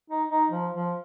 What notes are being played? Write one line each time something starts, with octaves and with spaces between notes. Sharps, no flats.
D#4
D#4
F3
F3